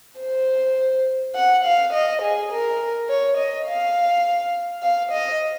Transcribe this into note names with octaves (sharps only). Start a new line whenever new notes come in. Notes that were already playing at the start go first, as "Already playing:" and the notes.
C5
F#5
F5
D#5
G#4
A#4
C#5
D#5
F5
F5
D#5